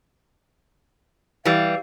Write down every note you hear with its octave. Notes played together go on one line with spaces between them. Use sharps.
E3 G3 F5